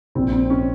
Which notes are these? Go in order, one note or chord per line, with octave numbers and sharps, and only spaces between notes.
A#1 C4
C4
C#4